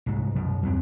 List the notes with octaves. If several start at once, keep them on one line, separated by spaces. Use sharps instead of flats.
C2 G#2
F#2 B2
E2 G2 A#3 C4